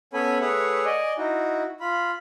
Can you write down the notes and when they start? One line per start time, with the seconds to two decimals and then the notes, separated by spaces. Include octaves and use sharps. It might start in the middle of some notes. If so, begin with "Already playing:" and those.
0.13 B3 C#4 A4 C#5 G#5 B5
0.41 A3 G#4 B4 C#5 E5 F#5
0.85 D5 D#5 G#5
1.18 D#4 E4 F#4
1.80 F4 B5